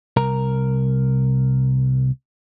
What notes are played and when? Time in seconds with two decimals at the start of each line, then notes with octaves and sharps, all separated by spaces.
0.17 C2 A#4 A#5